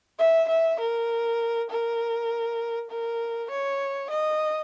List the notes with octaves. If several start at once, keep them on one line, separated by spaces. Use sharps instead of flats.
E5
E5
A#4
A#4
A#4
C#5
D#5